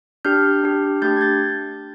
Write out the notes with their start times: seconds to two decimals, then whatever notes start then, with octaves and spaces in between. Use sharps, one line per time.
0.25 D4 G4 F6 G6
0.63 D4 G4
1.02 A3 D4 G4 G6 A6
1.17 G#6
1.21 G6 A6